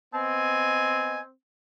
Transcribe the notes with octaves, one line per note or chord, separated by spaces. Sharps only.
B3 C4 D#5 G#5